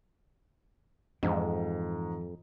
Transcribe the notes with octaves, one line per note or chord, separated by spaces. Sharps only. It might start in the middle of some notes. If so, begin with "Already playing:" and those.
F2 G#2 E3